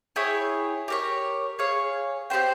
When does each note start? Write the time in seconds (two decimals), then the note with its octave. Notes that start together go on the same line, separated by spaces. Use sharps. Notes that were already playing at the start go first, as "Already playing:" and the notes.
0.16 E4 G#4 C#5 G5
0.88 G4 A#4 C#5
1.59 G#4 C#5 F5
2.30 C4 G4 C5 G5